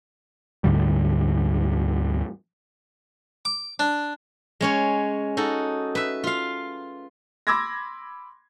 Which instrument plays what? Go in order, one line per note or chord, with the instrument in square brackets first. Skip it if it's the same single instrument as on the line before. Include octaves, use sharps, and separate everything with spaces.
[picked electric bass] D2 G#2 D3 G3
[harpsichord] D6
D4
[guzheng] G#3 C#4 C#5
D#4 F#4 A4
B4 E5
F4 F5
[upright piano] B5 C6 D6 E6 G#6 A#6